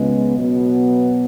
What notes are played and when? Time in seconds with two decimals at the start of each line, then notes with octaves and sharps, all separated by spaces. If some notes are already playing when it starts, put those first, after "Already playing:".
Already playing: C#2 C#3 G#3 B3
0.34 B2 F#3 B3